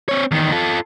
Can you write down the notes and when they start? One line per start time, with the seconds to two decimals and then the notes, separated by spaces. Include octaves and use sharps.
0.09 C4 C#5
0.31 E2 D#3
0.52 F4 A4